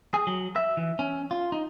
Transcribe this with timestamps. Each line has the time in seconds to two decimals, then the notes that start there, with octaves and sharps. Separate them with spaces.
0.14 G#4
0.27 F#3
0.56 E5
0.77 E3
0.99 C#4
1.31 F4
1.52 D#4